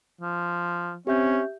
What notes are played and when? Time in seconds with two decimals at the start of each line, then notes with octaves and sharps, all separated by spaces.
0.21 F3
1.07 C4 C#4 G4 E5 G6